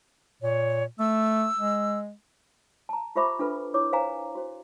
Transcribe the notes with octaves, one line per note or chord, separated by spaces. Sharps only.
A#2 C#5
A3 E6
G#3
A5 A#5
F4 G4 C5 E5 B5 D6
D4 F4 A4 B4
E4 C#5 D6
B4 C5 F5 G#5 A#5
F#4 C5